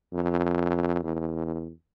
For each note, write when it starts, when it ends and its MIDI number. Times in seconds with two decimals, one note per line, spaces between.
0.13 1.01 41
1.03 1.71 40